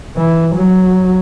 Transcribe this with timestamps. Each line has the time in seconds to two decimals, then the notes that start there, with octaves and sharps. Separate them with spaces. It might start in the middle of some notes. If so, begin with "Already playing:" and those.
0.16 E3
0.55 F#3